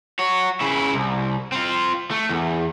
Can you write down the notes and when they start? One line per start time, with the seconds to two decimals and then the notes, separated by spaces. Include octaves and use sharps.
0.19 F#4 C#5
0.60 C#3 E4
0.94 C2
1.52 C4 F4
2.11 A3
2.29 E2